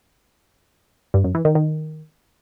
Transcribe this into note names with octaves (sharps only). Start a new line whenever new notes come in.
G2
F#2
E3
D#3
D#3